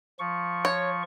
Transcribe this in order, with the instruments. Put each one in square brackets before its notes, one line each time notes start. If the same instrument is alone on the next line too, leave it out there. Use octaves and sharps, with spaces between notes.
[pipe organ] F3 C#6
[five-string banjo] C#5